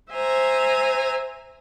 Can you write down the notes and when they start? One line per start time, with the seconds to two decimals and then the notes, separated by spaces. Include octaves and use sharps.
0.11 C5 E5 G#5 A#5